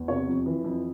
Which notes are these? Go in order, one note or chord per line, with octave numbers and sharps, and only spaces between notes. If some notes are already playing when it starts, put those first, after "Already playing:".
Already playing: E2
C3 C#5
F2
E3
F2